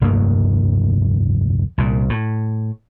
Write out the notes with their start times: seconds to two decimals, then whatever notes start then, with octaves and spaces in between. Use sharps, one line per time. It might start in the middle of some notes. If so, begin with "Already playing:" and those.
0.01 F1 D2 G2 A#3
1.78 C2 A#2
2.10 A2